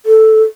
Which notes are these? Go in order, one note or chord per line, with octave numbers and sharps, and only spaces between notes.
A4